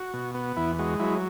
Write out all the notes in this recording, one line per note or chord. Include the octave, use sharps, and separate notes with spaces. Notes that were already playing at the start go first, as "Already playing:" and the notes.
Already playing: F#4
B2
B3
E2 E4
G#3 F#4
F#3 E4